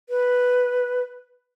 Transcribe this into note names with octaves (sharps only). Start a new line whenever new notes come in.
B4